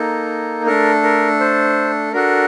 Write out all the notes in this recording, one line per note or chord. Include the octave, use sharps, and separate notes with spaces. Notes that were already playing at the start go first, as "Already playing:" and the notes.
Already playing: A#3 D#4 A4
A3 D4 A4 A#4
A#4
C5
D4 F#4 A4 A#4